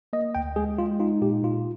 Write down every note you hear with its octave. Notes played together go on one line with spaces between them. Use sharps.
A#3 D#5
D2 G5
G#3 G#4
G#3 F4
D#4 F4
A#2 G4
A#2 F4